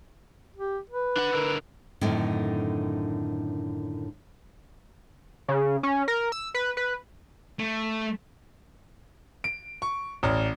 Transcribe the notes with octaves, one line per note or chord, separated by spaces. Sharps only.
G4
B4
D4 F#5
D3 A#4
F#2 A2 D3 D#3 C4
C#3
C#4
A#4
E6
B4
B4
A3
D7
C#6
A1 D5 A#5 F6